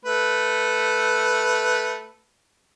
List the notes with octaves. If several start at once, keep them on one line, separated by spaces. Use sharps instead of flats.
A3 B4